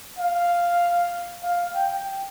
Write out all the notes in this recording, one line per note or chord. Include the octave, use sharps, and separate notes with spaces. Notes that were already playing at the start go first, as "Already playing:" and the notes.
F5
F5
G5